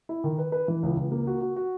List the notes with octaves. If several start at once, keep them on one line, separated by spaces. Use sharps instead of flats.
E4
D#3
B4
B4
E3
C#2
C#2
A#3
F#4
F#4
F#4